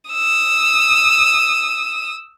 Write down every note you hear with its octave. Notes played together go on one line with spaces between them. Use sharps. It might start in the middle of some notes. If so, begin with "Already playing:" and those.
D#6 E6